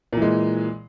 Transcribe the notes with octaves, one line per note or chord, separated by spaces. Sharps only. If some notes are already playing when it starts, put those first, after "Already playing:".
A#2 E3 G#3